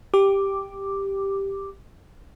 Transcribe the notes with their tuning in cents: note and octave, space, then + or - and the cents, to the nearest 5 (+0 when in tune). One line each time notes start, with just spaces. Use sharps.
G4 +0 D6 +0